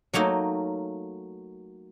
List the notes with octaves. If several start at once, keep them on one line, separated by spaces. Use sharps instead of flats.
F#3 A3 A#3 D#4